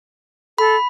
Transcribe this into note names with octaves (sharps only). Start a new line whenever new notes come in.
A4 B5